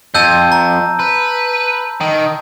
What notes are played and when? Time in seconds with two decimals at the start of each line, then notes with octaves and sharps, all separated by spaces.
0.15 F2 A5 E6 G6
0.52 A#5
0.99 B4
2.01 D#3